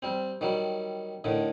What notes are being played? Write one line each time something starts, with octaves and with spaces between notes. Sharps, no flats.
G3 C4
D#3 F#3 G3
A2 D3 D#3